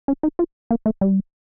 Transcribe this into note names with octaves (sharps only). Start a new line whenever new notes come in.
C#4
D#4
F4
A#3
A3
G3